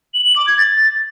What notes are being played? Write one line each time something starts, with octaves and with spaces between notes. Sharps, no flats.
F#7
F#7
D6
G#6
A6